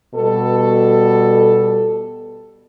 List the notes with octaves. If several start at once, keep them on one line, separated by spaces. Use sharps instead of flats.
B2 G3 A4